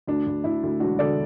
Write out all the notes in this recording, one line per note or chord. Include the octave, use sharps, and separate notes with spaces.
D2 D4
D2
D2 E4
D2
E1 D4 F#4
D3 A4 D5